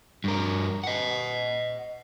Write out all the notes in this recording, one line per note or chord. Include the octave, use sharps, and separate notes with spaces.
G2 A#4
D#5 F#5